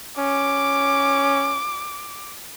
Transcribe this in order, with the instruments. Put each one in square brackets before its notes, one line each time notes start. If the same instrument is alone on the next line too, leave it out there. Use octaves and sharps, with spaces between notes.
[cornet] C#4 [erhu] D6